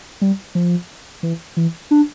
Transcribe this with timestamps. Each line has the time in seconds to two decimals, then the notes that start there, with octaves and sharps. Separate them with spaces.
0.21 G3
0.55 F3
1.23 E3
1.57 E3
1.91 D4